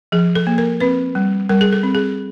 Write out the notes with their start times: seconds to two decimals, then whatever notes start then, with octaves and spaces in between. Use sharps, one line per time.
0.12 F3 G#4
0.35 A4
0.47 A#3
0.58 A#4
0.80 C4 B4
1.15 G3
1.49 G3 A#4
1.61 G#4
1.73 A4
1.83 C4
1.95 G#4